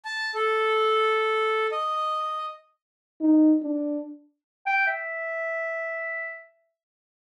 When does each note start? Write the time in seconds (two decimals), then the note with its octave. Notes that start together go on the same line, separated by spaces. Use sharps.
0.05 A5
0.35 A4
1.72 D#5
3.21 D#4
3.62 D4
4.66 G5
4.87 E5